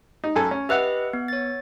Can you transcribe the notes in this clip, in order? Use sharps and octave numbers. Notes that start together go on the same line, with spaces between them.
D#4
F#2 A4 G#5
C#4
G4 B4 D#5 E5 F#5
B3
C#5 A6